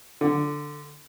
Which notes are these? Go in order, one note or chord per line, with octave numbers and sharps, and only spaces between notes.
D3